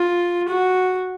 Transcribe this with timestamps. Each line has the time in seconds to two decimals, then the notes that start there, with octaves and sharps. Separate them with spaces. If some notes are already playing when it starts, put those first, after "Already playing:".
Already playing: F4
0.48 F#4